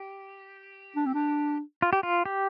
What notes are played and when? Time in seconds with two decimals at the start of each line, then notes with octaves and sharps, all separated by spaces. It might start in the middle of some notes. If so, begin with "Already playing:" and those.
Already playing: G4
0.96 D4
1.06 C4
1.14 D4
1.82 F4
1.93 G4
2.03 F4
2.26 G4